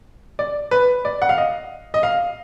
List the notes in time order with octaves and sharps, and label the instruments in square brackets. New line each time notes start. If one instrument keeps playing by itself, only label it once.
[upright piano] D5
B4
D5
F#5
F5
D#5
D#5
F5